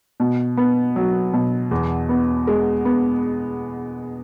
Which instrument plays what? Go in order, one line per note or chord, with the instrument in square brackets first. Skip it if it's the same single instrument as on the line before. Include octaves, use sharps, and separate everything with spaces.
[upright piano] B2
B3
F#3
B2
E2
B3
G#3
B3